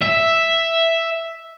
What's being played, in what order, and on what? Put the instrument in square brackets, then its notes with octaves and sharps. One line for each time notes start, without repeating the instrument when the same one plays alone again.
[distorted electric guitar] E5